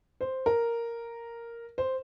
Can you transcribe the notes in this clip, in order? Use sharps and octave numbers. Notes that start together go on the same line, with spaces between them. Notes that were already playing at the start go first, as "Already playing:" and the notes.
C5
A#4
C5